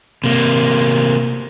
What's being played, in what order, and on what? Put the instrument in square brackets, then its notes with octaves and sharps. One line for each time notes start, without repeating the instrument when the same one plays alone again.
[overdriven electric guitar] C3 A#3